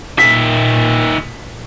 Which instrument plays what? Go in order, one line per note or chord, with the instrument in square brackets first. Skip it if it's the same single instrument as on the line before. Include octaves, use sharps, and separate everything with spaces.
[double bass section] A#2 [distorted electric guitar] D#3 E5 [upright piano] B6